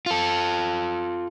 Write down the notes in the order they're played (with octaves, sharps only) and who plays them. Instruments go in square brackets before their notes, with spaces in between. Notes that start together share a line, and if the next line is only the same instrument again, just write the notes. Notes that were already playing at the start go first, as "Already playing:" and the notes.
[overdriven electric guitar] F4 A4